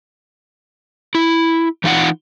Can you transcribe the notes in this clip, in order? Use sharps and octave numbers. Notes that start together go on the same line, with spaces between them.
E4
E3 D#4 F4 E5 F#5